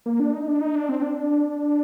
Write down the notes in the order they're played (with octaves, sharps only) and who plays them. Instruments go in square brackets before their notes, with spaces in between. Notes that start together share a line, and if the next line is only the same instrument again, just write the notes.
[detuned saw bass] A#3
D4
D#4
D4
D#4
D4
C4
D4
D4